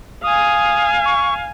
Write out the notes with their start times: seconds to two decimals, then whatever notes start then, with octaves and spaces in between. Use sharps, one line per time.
0.23 F5 G#5 D#6
1.05 C#6